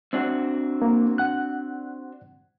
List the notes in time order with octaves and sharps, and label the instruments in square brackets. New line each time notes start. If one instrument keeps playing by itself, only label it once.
[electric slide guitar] C4 D4 F#4
[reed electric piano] A#3
F#5 F#6